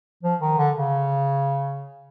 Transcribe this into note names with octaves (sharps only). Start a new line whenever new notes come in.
F3
D#3
D3
C#3